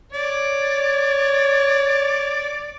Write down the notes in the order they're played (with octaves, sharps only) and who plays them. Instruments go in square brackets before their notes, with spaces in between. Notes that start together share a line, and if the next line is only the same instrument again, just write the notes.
[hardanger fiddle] C#5 [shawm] D5